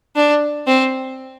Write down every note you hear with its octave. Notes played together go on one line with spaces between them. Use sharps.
D4
C4